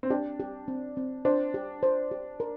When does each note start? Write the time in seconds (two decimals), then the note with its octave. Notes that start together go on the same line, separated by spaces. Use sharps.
0.03 C4
0.10 D4 G4
0.40 G4
0.68 C4
0.97 C4
1.25 D4 C5
1.54 G4
1.83 C5
2.11 G4
2.40 A#4